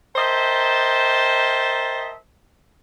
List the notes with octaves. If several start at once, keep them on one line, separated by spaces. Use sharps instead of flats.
A#4 C5 D#5 E5 G5 A5